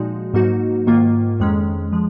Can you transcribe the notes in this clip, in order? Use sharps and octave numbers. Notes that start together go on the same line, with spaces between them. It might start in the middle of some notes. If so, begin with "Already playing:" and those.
Already playing: A#2 F3 G#3 D#4 F#4
G#2 F#3 A#3 D#4 F#4
G#2 D#3 A#3 F4
F2 D#3 G#3 C#4
F3 G#3